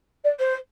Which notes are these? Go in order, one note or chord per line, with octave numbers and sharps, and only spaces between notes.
D5
C5